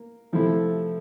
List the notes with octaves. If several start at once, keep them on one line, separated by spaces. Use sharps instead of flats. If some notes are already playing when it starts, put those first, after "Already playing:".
Already playing: A#3
C3 F3 A3 E4 A4